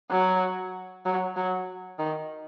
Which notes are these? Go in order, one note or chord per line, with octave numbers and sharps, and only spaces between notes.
F#3
F#3
F#3
D#3